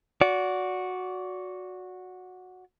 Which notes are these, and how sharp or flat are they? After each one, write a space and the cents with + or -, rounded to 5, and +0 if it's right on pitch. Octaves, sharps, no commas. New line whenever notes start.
F#4 -10 D5 -25